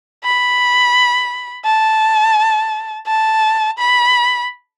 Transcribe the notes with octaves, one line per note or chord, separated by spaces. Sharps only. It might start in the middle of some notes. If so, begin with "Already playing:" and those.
B5
A5
A5
B5